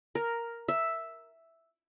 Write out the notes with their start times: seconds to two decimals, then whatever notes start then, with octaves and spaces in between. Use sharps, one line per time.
0.15 A#4
0.68 E5